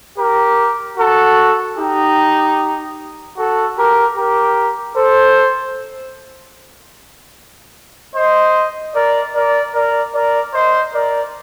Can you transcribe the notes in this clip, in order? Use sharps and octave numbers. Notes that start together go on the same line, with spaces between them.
G4 A#4
F#4 A4
D#4 G4
F#4 A4
G4 A#4
G4 A#4
A4 C5
C5 D#5
A#4 D5
A#4 D5
A#4 D5
A#4 D5
C5 D#5
A#4 D5